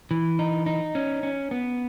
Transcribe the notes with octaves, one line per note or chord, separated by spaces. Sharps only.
E3
D#4
D#4
C#4
C#4
B3